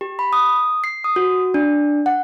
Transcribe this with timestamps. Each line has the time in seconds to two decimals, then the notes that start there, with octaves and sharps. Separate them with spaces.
0.01 G4
0.19 B5
0.33 D#6
0.84 C7
1.04 D#6
1.16 F#4
1.54 D4
2.06 F#5